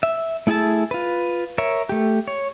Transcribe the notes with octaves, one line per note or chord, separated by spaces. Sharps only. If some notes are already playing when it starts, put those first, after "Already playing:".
E5
A3 E4 G#4 E5 A5
F4 B4
A#4 C#5 E5
A3 G4
C#5